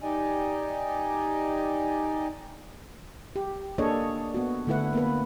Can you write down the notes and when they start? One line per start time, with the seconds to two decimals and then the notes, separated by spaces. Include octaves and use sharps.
0.01 D#4 G4 D5 D#5 G#5
3.36 G4
3.78 A#3 D4 G#4 A4 C#5 D#5
4.34 B3 F#4
4.67 D3 A3 E4 B4 F#5
4.93 A#3 B3 B4